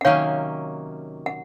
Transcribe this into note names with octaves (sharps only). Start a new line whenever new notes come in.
F#5
C3 D#3 F#3 A#3 C#4 C#5 F5
F#5